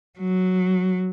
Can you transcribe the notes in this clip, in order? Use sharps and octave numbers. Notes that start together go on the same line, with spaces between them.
F#3